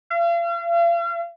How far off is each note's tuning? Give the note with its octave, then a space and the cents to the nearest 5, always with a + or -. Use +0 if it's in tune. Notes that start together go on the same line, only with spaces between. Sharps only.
F5 -40